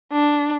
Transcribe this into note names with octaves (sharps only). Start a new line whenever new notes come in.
D4